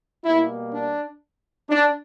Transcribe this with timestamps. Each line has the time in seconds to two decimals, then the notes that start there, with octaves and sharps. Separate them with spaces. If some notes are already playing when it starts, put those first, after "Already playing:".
0.24 B2 G3 A#3 E4
0.72 D4
1.70 D4